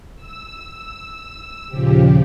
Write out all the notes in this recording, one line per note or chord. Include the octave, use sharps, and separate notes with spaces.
E6
D#2 A#2 C#3 F3 G4